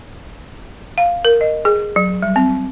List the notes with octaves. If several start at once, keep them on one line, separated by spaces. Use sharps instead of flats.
F5
A#4
D#5
G#4
F#3
G3
C4